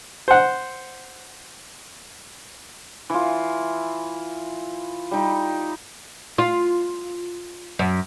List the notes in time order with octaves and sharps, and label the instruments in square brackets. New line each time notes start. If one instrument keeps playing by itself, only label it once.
[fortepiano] C5 F#5
[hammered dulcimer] E3 F4
G3 D#4
[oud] F4
F#2